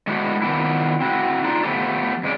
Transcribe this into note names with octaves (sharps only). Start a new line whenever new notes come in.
G#3 A3 B3 D4 E4 F#4
D#3 F3 B3 D4 E4
C4 E4 F#4
D4 D#4 F4
F3 A3 B3 G4 A4
F2 G#3 C#4 D5